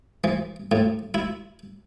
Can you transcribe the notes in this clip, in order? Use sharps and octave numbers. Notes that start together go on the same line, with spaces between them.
E3
A2
E4